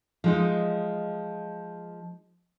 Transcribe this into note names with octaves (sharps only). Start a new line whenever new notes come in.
F3 G#3 D#4